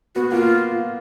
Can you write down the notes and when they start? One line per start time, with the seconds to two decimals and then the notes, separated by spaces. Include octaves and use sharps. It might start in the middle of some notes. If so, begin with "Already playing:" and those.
0.15 B3 F#4
0.32 A#3 F4